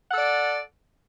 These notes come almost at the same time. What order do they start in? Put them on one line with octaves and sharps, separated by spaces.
F#5 A4 D5